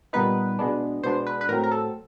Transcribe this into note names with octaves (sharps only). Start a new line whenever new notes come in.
A#2 G3 B3 D#4 B4
B2 G#3 B3 D4
B2 G#3 B3 D4 C5
B4
B4
A2 F#3 A3 C4 A#4
A#4
A4